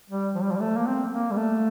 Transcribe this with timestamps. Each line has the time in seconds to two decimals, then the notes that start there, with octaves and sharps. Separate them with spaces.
0.10 G3
0.35 F3
0.43 G3
0.51 F3
0.56 G3
0.61 A3
0.77 A#3
0.87 C4
1.12 A#3
1.31 G3
1.37 A3